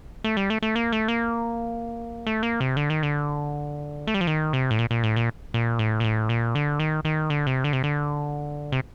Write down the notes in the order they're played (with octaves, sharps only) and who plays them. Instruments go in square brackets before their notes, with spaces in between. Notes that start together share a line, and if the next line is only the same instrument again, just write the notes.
[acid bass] A3
G3
A3
A3
A#3
A3
A#3
A3
A#3
C3
D3
D#3
D3
A3
G3
F3
D#3
C3
A2
A#2
A#2
A2
A#2
A#2
A2
A#2
A2
A#2
D3
D#3
D#3
D3
C3
D3
C3
D3
C3